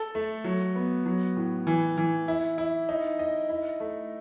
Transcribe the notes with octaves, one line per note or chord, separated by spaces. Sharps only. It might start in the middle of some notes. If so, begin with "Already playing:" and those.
Already playing: A4
A3
F#3
B3
F#3
A2
E3
E3
E4
E4
D#4
D#5
E4
A3